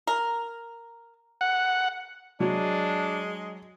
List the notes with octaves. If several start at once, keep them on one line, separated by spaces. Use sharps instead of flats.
A#4
F#5
F#3 G#3 D4